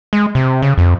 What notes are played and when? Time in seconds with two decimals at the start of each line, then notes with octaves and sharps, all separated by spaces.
0.13 G#3
0.35 C3
0.62 C#3
0.78 F2